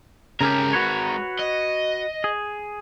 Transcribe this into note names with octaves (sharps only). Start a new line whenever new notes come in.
C#3 G#3 C#4 G4 A#4
F#4 B4 C#5
D#5
G#4